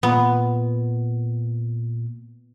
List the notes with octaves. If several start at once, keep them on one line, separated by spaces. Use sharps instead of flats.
A#2 B3